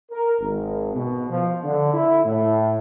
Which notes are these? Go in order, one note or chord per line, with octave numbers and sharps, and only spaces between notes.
A#4
G#1
B2
F3
D3
E4
A2